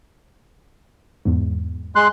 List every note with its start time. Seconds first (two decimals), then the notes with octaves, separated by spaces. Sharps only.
1.25 E2 G#2
1.95 G#3 C6 F#6